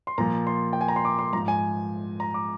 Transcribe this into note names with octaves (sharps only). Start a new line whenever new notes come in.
C6
A#2 F3 A#5
C6
G5
G#5
A#5
C6
D6
C6
G#2 F3 A#5
G#5
A#5
D6